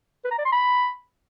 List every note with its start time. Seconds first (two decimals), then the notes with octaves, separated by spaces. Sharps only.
0.25 B4
0.31 A#5
0.38 D5
0.45 C6
0.52 B5